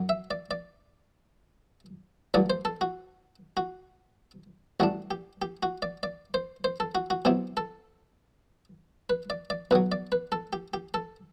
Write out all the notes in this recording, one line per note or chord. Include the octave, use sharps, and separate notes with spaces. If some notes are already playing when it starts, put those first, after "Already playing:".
Already playing: F#2 F#3
E5
D5
D5
A1 G2 D3 F#3 D5
C5
A4
F#4
F#4
A1 A2 G3 D4 F#4
G4
G4
F#4
D5
D5
C5
C5
A4
F#4
F#4
B2 F#3 C4 E4 G4
A4
B4
D5
D5
B1 B2 F#3 B4
D5
B4
A4
G4
G4
A4